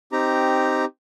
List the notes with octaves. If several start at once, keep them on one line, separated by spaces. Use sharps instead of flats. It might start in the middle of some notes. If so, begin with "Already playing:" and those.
C4 D#4 G4 A#5